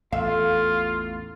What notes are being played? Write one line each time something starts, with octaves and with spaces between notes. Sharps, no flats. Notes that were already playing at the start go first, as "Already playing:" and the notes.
A1 E2 F4 A4 F5